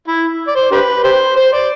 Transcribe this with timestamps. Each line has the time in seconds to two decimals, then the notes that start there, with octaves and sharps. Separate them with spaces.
0.07 E4
0.47 D5
0.55 C5
0.71 D4 G4 B4
1.04 G4 C5
1.36 C5
1.53 D5